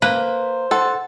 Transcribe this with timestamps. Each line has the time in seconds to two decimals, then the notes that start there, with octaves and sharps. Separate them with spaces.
0.02 A#3 B4 C5
0.71 A4 F#5 C6